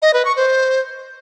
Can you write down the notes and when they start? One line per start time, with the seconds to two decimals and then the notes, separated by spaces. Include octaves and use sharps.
0.02 D#5
0.14 B4
0.25 C#6
0.36 C5